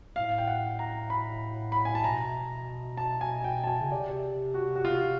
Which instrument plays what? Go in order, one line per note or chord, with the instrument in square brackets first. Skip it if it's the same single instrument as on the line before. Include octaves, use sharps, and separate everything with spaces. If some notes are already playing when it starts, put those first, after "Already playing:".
[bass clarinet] A2 [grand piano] F5
[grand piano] G5
F#5
A#5
B5
B5
G#5
A5
[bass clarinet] B2 [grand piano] A#5
[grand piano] A5
G#5
G5
A5
G#5
[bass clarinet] C#3
[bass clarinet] C3 [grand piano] D5
[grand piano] F#4
F#4
F4